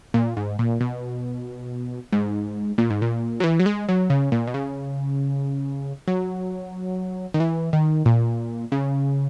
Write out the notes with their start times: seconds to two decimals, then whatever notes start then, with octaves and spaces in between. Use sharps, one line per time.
0.14 A#2
0.37 G#2
0.59 A#2
0.81 B2
2.12 G#2
2.78 A#2
2.90 G#2
3.02 A#2
3.40 F#3
3.44 E3
3.60 F#3
3.66 G#3
3.89 F#3
4.10 C#3
4.32 A#2
4.47 B2
4.54 C#3
6.08 F#3
7.34 D#3
7.40 E3
7.73 D#3
8.06 A#2
8.72 C#3